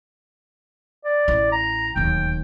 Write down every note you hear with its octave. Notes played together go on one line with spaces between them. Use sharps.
D5
A1 E4
A#5
D1 D#2 G5